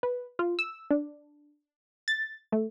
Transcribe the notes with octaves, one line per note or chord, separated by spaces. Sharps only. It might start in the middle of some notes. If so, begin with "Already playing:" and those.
B4
F4
E6
D4
A6
A3